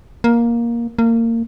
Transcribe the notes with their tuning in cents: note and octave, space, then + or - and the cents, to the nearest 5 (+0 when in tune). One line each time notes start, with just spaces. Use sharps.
A#3 +10
A#3 -25